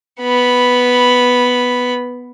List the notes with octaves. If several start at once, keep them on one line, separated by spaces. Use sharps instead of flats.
B3 B5